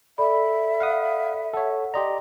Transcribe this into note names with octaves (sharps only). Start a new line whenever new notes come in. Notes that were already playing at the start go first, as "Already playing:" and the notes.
A4 D5 E5 B5
F5 F#5 D#6
A4 C#5 F#5
G4 D5 D#5 A#5 C6